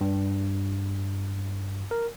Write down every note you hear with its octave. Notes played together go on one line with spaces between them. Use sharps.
G2
A#4